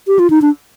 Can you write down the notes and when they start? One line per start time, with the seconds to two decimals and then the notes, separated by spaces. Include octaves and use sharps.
0.07 G4
0.19 F4
0.30 D#4
0.42 D4